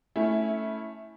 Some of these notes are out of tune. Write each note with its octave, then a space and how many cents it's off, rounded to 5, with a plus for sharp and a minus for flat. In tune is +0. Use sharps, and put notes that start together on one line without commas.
A3 +0 C#4 +0 E4 -15